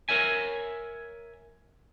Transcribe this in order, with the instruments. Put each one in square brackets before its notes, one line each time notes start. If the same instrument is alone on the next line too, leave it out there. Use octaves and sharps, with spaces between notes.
[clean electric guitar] A#4 C#5 E5 G#5